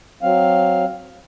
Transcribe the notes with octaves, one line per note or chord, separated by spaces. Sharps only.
F#3 C4 F5